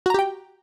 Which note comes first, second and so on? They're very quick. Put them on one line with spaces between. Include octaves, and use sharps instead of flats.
F#4 A#5 G4 G5